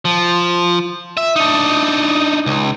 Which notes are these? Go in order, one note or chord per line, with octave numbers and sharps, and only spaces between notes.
F3
E5
D4 D#4
C#2